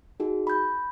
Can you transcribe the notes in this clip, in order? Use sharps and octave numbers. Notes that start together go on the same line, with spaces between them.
D#4 F#4 G#4
B5 G6